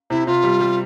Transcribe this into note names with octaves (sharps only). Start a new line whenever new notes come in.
C3 E4
C3 F4
G3
G3